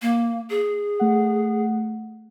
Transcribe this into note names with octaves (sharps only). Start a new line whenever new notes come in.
A#3
G#4
A3 F#5